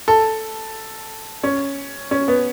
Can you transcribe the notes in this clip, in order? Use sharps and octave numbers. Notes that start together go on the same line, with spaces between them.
A4
C#4
C#4
B3